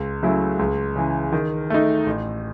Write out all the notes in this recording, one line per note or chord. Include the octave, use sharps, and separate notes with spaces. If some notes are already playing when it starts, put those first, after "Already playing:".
Already playing: C#2
C#3 F#3 A3 E4
C#2
C#3 E3
D#3
A3 D#4
A1